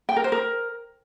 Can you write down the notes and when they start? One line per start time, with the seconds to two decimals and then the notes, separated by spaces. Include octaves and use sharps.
0.09 G5
0.16 A#4
0.24 C5
0.32 A#4